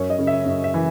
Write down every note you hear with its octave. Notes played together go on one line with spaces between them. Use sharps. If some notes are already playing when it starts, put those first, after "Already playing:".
Already playing: F#2 C#5
D#5
C#3
E5
F#2
E5
E3